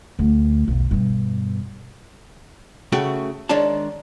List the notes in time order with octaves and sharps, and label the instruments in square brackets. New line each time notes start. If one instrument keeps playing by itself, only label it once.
[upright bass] D2
B1 E2
G2 B2
[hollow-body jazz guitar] C#3 A3 F#4 G5
D#3 G#3 D4 C#5 D5 A5